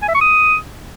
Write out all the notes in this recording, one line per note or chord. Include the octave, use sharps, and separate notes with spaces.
G#5
E5
C#6
D#6